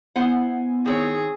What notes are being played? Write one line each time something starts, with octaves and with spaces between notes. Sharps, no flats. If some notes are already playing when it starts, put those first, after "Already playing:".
B3 E4 C5 F#5 G#5
D#3 C4 G#4 C#5